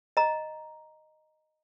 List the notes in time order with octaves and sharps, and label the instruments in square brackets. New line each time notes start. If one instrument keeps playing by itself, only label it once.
[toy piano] D#5 A#5